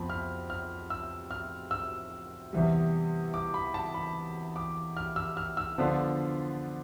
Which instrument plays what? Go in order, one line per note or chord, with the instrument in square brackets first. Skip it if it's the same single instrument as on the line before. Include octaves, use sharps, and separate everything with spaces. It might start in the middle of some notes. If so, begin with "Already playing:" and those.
Already playing: [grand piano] F2 F3 B3 B5
F6
F6
E6
F6
E6
E2 C3 E3 G3
D6
B5
A5
B5
D6
F6
E6
F6
E6
D3 F3 B3 D4 F4